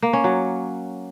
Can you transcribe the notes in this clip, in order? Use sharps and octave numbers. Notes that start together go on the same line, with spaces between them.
A#3
C#4
F#3